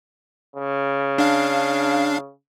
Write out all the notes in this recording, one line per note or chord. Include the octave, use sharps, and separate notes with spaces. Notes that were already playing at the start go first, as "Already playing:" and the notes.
C#3
D4 F5